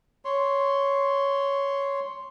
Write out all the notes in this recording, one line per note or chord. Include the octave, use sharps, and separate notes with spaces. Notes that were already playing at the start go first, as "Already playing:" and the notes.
C#5 C6